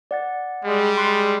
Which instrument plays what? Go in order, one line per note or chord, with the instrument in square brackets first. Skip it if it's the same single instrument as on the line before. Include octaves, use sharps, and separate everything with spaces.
[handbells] D5 F#5 A6
[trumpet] G3 [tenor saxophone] G#3
[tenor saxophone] G#3 [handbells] C6 F#6 C7